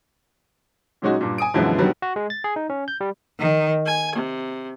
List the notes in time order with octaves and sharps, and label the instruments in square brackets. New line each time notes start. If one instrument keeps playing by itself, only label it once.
[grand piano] A#2 F#3 G#3 C#4 D#4 F#4
G2 A#2
G#5 D#6 D7
F#2 B2 D3 E3 F3 G#3
D3 D#3 F#3 G3 B3
[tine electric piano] F#4
G#3
A6
G#4
D#4
C#4
G6
G3
[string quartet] D#3
G#5
C3